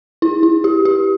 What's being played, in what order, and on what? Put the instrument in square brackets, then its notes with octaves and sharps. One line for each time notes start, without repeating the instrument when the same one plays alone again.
[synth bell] E4
E4
G4
G4